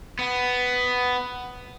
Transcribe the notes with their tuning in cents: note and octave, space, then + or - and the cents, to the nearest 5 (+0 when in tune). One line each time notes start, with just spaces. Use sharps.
B3 +10